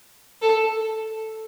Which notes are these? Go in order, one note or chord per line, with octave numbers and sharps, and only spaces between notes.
A4